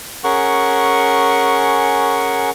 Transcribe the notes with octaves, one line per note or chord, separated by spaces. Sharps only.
C#4 G#4 A#4 F#5 C#6